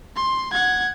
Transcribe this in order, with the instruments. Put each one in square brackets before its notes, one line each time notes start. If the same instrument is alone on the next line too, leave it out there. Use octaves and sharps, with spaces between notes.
[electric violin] C6
F#5 G#6